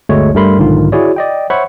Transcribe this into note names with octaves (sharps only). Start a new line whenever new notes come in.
G1 D2 G#3 A3 C#5
G2 G3 A3 A#4 B5 C6
B1 G#2 D3 D#3 F4
E4 F#4 G#4 C#5 D5
D5 D#5 G5
C5 C#5 E5 F#5 B5 C#6